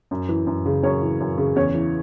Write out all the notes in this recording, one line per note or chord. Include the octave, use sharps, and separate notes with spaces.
F#2
E3
F#2
C#3
F#2 C#4 C#5
E3
F#2
C#3
E2 C#4 C#5
E3